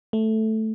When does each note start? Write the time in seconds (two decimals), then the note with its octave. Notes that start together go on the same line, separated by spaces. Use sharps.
0.13 A3